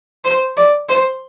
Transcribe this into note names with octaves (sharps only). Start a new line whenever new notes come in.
C5
D5
C5